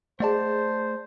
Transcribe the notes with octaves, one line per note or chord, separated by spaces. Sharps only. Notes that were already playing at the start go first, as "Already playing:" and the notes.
A3 G#4 C5 D5 D#5 F#5 A5